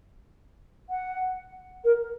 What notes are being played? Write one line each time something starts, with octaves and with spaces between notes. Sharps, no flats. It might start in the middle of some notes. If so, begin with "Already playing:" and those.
F#5
A#4